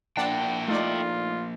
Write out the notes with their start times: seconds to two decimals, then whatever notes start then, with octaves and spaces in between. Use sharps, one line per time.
0.17 F3 A#3 D4 E4 F#5 G5 A5
0.68 A3 D#4 F4 D5